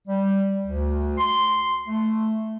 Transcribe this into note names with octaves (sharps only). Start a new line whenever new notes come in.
G3
D2
C6
A3